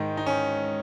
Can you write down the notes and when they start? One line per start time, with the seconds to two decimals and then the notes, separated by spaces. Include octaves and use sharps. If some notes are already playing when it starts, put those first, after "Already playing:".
Already playing: G#2 D#3 D#4
0.17 D#4
0.26 C#4